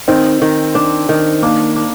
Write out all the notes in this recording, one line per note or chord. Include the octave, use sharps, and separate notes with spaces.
D#3 C4
D#3
D4
D#3
A#3 D4
D4